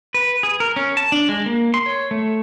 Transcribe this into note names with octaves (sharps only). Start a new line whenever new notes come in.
B4
G#4
A#4
C#4
A5
D4
G#3
A#3
C6
C#5
A3